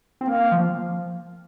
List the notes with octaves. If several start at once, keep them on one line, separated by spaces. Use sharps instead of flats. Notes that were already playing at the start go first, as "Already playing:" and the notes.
C4
A#3 F5
F3